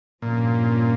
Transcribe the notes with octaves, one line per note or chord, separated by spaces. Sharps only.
G2 A#2 F3 A#3 C#4 F4